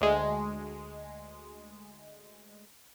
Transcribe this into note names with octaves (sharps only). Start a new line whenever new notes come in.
D2 G#3